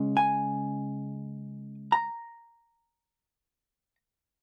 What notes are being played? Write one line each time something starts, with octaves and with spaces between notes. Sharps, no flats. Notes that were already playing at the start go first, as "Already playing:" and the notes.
Already playing: C#3 G#3 C#4
G#5
A#5